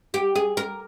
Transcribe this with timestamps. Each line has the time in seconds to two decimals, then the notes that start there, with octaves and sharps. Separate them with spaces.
0.14 G4
0.36 G#4
0.57 A#4